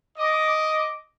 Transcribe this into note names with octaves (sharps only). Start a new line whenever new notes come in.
D#5 D6